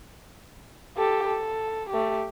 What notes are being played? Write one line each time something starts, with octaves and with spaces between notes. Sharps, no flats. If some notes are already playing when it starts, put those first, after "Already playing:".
G4 A4
A4
A3 G4